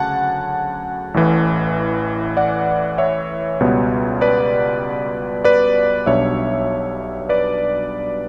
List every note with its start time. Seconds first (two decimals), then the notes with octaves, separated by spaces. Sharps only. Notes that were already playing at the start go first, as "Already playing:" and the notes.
Already playing: D2 C#3 F#3 F#5 A5
1.14 A1 A2 E3
2.37 D5 F#5
2.98 C#5 E5
3.60 C#2 B2 G3 B3
4.21 B4 D5
5.44 B4 D5
6.06 B1 B2 G3 D4 C#5 E5
7.29 B4 D5